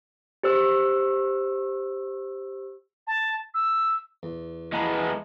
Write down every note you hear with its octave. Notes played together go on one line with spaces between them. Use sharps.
G4 C5 E6
A5
E6
E2
E3 F3 G#3 B3 D#5 A5 A#5